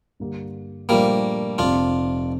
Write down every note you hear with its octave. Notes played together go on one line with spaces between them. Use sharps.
G2 D3 G3 A#3
A#2 F3 G3 A3 A#3 D4
F1 F2 C3 D4 F4